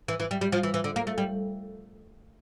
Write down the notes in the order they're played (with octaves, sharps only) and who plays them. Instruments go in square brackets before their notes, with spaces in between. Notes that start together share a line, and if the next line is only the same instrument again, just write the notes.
[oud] E3
E3
G3
G3
F3
E3
E3
D3
A#3
A3
G3